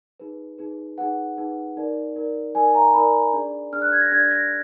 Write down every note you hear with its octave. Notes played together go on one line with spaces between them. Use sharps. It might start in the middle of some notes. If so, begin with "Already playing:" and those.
D#4 G#4 B4
D#4 G#4 B4
D#4 G#4 B4 F#5
D#4 G#4 B4
D#4 A#4 D5
D#4 A#4 D5
D#4 A#4 D5 G#5
A#5
D#4 A#4 D5 B5
D4 G#4 D5
D4 G#4 D5 F6
F#6
G#6
A#6
D4 G#4 D5 G#6
A#6